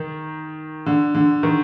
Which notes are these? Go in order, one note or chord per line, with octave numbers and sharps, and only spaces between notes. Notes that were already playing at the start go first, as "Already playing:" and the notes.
Already playing: D#3
D3
D3
D#3